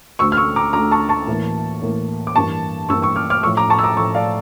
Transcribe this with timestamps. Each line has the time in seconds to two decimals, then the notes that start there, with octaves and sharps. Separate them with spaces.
0.19 D2 D3 A3 C#6 E6
0.32 F6
0.37 C#6 E6
0.56 A#5 D6
0.73 D2 D3 A3 A#5 D6
0.92 A5 C#6
1.09 A5 C#6
1.27 A2 E3 A#3
1.82 A2 E3 A#3
2.27 D6
2.36 G2 E3 A#3 A5 C#6
2.89 G2 E3 A#3 C#6 E6
3.02 C#6 E6
3.16 D6 F6
3.30 D6 F6
3.43 A2 F3 A3 C#6 E6
3.57 A#5 D6
3.70 A5 C#6
3.79 E6
3.84 A#5 D6
3.97 A2 F3 A3 C#6 E6
4.15 D5 F5